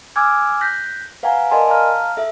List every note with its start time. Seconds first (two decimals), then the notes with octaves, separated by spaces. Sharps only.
0.16 G#5 D6 E6 F6 G#6
0.61 F#6 G6 A#6 B6
1.23 B4 F5 F#5 G#5 A#5
1.51 A#4 D5 D#5 G#5 A5 C6
1.68 F5 A5 A#5 F6
2.17 A4 E5